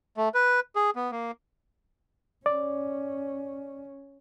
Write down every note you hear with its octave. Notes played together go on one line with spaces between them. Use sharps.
A3
B4
G#4
B3
A#3
C#4 D5